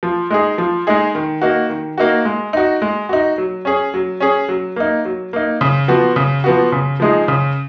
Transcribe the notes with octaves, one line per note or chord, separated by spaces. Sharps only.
F3
G#3 D#4 G#4
F3
G#3 D#4 G#4
D#3
A#3 D#4 F#4
D#3
A#3 D#4 F#4
G#3
D#4 F#4
G#3
D#4 F#4
F#3
C#4 G#4
F#3
C#4 G#4
F#3
A#3 D#4
F#3
A#3 D#4
C#3
F3 B3 F#4
C#3
F3 B3 F#4
C#3
F3 G#3 D#4 G#4
C#3